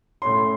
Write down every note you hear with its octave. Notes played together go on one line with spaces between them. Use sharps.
A2 A3 C#4 C6